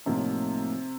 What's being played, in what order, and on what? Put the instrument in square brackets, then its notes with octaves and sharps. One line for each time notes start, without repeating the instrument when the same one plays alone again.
[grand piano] A1 A2 F3 A#3 D#4 [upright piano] C3